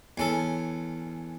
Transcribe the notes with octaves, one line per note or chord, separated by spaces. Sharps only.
E2 C#4 A4